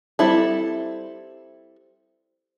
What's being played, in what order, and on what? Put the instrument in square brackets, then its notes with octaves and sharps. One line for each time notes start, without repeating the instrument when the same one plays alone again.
[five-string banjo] G3 C4 E4 A4